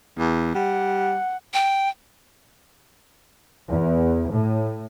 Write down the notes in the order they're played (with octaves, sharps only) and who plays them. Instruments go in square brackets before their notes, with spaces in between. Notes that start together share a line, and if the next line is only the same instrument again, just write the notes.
[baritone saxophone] E2
[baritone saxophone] G3 [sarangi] F#5
[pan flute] G5
[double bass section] E2
A2